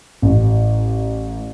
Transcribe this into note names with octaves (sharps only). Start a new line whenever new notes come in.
A1